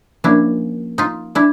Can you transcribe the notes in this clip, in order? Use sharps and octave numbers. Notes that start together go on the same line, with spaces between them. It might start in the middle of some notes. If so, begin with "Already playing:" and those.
F3 A#3 C#4 D4 E4
D#4 F4
D4 E4